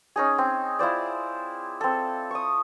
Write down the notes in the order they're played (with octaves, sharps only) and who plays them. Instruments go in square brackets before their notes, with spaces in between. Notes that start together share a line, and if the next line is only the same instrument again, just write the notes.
[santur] C#4 D#4 G#4
C4
E4 F4 C5 D5
C4 A4
C#6 D#6